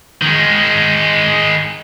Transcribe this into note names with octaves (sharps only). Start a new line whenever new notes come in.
D#3 G#3